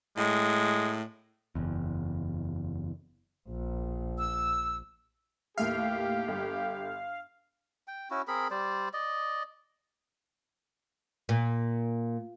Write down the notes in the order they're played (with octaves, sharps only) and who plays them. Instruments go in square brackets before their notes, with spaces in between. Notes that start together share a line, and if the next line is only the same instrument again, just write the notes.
[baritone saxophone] A2 [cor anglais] G#3
[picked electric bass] F#1 E2
[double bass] A#1
[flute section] E6
[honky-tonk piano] D#2 A2 E5 [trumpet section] G4 [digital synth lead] F5
[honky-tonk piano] G1
[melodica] G5
C#4 E4 F#4
C4 G#4 A#4 B5
G3 C5 D5
D5 D#5
[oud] A#2